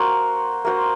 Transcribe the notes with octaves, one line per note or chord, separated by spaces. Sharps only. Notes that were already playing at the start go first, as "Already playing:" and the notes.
Already playing: A#3 F#4 C5
A#3 F#4 C5